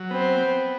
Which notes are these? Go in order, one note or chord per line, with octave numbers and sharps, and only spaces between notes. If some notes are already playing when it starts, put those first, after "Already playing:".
Already playing: F#3
B3 C4
B3